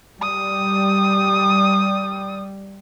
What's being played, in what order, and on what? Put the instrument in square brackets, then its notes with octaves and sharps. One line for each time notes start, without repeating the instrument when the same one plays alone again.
[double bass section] G3 [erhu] D#6